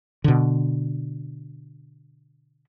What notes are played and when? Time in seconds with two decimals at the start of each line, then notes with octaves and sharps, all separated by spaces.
0.24 B2 D3